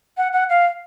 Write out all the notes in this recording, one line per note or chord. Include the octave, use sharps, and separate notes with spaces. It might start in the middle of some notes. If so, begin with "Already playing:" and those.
F#5
F#5
F5